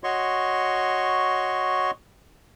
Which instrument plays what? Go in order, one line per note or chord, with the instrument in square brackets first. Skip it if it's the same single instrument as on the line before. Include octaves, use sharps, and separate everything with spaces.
[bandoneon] F#4 C#5 D#5 C6 C#6